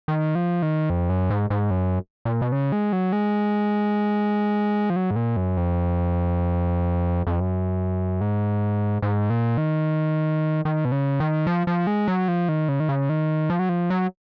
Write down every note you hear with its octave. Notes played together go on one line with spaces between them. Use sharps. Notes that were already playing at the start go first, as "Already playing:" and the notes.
D#3
F3
D#3
F2
F#2
G#2
G#2
F#2
A#2
B2
C#3
G#3
F#3
G#3
F3
F#3
G#2
A#2
F#2
F2
F2
F#2
G#2
G#2
A#2
D#3
D#3
B2
C#3
D#3
F3
F3
G#3
F#3
F3
D#3
C#3
D#3
C#3
D#3
F3
F#3
F3
F#3